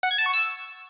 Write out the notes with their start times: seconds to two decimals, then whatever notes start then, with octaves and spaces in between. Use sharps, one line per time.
0.03 F#5
0.11 G#6
0.18 A5
0.26 C#6
0.34 E6